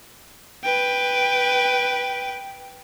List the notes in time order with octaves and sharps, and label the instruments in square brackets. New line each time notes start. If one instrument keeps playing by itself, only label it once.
[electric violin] B4 G5